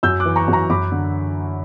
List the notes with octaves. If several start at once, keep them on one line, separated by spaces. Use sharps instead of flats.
F#2 E6 G6
D6 F#6
E3
A#5 C#6
F#2
A#5 C#6
F#2 B5 D6
D3